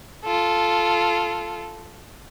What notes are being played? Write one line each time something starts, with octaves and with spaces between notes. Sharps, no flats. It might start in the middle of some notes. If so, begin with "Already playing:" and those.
F4 A4